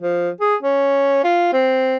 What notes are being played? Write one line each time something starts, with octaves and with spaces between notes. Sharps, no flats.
F3
G#4
C#4
F4
C4